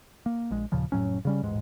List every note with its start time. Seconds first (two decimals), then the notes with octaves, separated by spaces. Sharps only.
0.26 A#3
0.51 A#1 G#3
0.72 D#2 A#2 C#3 F3
0.92 F1 A2 F#3 C#4
1.25 C#3 G3 C#4
1.43 D#1 A1 G#2 G#3